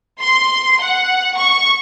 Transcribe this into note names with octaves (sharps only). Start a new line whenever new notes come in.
C6
F#5
C#6